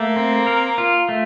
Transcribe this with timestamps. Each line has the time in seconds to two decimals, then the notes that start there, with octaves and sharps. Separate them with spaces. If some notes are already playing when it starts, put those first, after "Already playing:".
Already playing: A3 A#3
0.16 C4
0.47 A#4
0.78 F4
1.09 A3